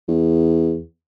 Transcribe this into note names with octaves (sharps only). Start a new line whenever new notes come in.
E2